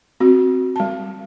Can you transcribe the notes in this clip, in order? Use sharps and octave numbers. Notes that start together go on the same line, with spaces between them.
C4 F#4
G3 A5